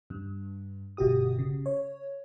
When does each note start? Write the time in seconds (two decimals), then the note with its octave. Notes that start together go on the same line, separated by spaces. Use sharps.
0.10 G2
0.97 G1 B2 F#4 G4 D#6
1.39 C#3
1.66 C#5